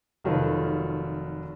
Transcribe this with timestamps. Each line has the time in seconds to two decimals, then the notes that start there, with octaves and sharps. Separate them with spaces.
0.24 F1 D#3 F#3 F4 A4 B4